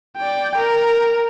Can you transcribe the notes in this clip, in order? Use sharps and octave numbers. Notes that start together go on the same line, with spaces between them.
D5 G5
A#4